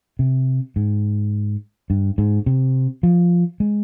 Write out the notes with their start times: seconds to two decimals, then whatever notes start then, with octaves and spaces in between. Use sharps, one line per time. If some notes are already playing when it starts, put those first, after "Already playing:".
0.19 C3
0.76 G#2
1.90 G2
2.18 G#2
2.46 C3
3.03 F3
3.60 G#3